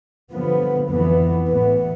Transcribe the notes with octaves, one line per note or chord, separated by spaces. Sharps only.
G2 D3 F3 B3
F2 E3 B3
A1 A2 E3 B3